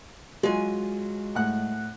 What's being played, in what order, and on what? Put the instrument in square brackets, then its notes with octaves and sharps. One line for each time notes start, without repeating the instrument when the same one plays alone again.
[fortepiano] F#3 F4 [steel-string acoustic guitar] G#3 G#5
[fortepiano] A2 F#5 F#6